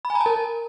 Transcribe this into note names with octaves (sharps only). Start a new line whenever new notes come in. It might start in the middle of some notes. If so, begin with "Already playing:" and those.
B5
G#5
A#5
A5
A#4